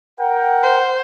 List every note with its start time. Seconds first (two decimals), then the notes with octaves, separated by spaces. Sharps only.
0.19 A#4 F#5 G5
0.63 C5